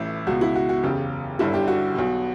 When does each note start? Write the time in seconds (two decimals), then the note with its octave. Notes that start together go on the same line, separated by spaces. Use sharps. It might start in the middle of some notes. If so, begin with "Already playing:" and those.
Already playing: A1 A2 E3 E4
0.27 C#2 B2 F#4
0.41 E4
0.55 F#4
0.69 F#4
0.83 F#1 E2 C#3 G4
1.39 G1 G2 D3 E4
1.54 G4
1.68 F#4
1.95 B1 B2